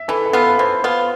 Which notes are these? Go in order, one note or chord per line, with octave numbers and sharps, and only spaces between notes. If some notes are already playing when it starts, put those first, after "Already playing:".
Already playing: E5
E3 A4
A4
B3 F4
B4
E3 C5
B3 F4